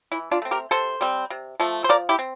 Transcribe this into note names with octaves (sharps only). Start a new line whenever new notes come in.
E3 E4
D4 F4
A3 C4
G4 A#4
C3 A4 C5
G3 C4
C3
F3 A3
C5
F3 A#4 D5
E4 G4
C4